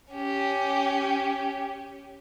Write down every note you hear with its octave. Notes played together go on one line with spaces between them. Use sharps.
C#4 G4